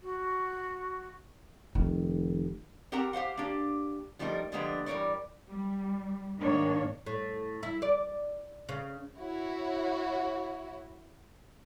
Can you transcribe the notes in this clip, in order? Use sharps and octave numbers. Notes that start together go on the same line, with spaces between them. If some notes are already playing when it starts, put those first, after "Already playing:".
F#4
F1 D#3
C4 G4 A#4 F#5 A5 A#5
G4 C5 F5 F#5
A#3 D4 G4
F3 G3 A3 D#4 F4 A#4
D3 F3 G3 G#3 A#3 B3
E3 G3 B3 A#4 C#5 D5
G3
G#2 D#3 A#3 D4 C#5
A2
E4
D5
C#3
E4 F#4 C#5